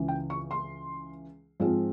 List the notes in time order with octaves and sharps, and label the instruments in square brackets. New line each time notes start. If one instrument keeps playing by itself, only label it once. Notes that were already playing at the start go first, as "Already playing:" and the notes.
Already playing: [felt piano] C#2 C#3 E3
G5
C#6
C6
G#2 F3 G#3 C4 F4